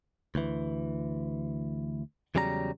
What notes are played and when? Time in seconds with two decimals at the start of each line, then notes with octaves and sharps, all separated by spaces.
0.35 D2 E3
2.35 E2 C#3 F#3 G3 A4 A#5